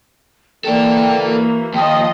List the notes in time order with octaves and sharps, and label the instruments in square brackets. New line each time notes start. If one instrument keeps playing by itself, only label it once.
[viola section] E3 A#3 [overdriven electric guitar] A4 D5 [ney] G5
[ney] F#4
[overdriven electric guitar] D#2 [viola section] F3 D#5 [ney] G5